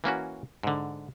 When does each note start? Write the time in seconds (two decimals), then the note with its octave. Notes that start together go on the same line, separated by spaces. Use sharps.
0.04 E3 A#3 C#4 F#4
0.63 G#2 D3